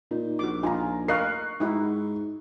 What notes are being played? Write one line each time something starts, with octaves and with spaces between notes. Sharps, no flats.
A#2 D#4
A#1 F#4 D6
D#4 F4 G#5 A#5
A#4 D#5 F5 C#6 F#6 C7
G#2 D#4 E4 F#4